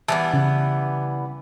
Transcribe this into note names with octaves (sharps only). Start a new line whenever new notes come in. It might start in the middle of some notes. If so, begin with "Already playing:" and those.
E3 G3 B3 A5
C#3